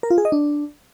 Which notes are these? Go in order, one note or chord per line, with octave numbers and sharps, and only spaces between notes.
A#4
F4
G#4
D#5
D4